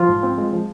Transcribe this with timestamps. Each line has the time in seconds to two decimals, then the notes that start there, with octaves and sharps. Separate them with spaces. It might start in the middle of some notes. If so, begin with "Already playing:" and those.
Already playing: F3 F4
0.09 G#2
0.23 C4
0.38 G#3
0.53 F3